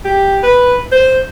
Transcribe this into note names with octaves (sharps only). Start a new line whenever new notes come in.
G4
B4
C5